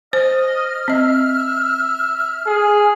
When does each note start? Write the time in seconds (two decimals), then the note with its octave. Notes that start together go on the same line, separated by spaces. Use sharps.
0.13 C5 D#5 F6
0.88 C4 D#5 E5
2.46 G#4